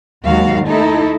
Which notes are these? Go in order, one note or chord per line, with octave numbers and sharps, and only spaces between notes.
D#2 G#2 F#3 F#4 F5
A3 D#4 E4 A4